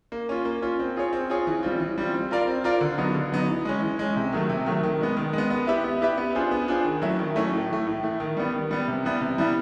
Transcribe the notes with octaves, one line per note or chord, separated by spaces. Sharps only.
A#3
C#4 F4
A#3
C#4 F4
C4
F4 G#4 C#5
C4
F4 G#4 C#5
E3
G3 C4 F4
E3
G3 C4 F4
C4
F4 A#4 D5 F5
C4
F4 A#4 D5 F5
D3
F#3 B3 D#4
D3
F#3 B3 D#4
E3
G#3 C#4
E3
G#3 C#4
C3
D#3 F#3 A3
C3
D#3 F#3 A3
D#3
G#3 B3
D#3
G#3 B3
B3
E4 G4 B4 E5
B3
E4 G4 B4 E5
B3
D4 F4 G#4 C5
B3
D4 F4 G#4 C5
D#3
F#3 A3 C#4 E4
D#3
F#3 A3 C#4 E4
A2
E3 A3
A2
E3 A3
D#3
G3 B3
D#3
G3 B3
C3
E3 G3 B3 E4
C3
E3 G3 B3 E4